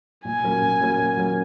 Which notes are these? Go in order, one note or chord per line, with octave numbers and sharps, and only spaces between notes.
A#2 G#5
F#3 A#3 C#4 A#4
A#2
F#3 A#3 C#4 A#4
A#2
F#3 A#3 C#4 A#4